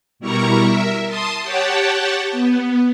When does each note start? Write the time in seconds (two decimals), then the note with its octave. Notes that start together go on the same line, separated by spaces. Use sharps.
0.19 B2 G3 E4 A#4 A#5 C#6
0.62 A#4 E5
1.06 A5 C6 D#6
1.42 G4 C#5 F#5 G5 A5
2.31 B3